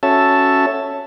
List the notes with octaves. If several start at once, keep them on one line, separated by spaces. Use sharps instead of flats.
C#4 F#4 A4 C#5 E5 A5